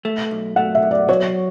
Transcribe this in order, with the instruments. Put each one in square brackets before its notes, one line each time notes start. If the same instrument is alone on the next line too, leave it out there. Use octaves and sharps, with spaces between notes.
[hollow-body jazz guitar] A3
B1
[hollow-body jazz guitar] A3 [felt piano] F#5
[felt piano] E5
[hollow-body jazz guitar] B1
[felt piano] D5
[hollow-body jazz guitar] F#3 [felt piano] C#5